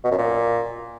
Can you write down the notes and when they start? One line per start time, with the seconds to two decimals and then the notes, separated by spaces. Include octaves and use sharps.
0.04 B2
0.11 F#2
0.18 A#2